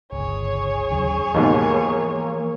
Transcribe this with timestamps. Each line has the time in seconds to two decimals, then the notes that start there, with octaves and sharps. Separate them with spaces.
0.12 G1 C#2 G#4 C#5
0.91 D#2 C#3 F#3
1.34 D#2 G#2 B2 E3 F3 A#3